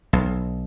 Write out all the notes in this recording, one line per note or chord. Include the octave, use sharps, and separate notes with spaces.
B1